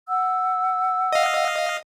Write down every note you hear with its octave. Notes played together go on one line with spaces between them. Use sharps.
F#5 E6
D#5 F5